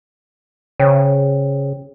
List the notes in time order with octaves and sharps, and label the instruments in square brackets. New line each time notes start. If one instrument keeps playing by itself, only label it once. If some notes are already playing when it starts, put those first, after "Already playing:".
[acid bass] C#3 [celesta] C5 C#5 G5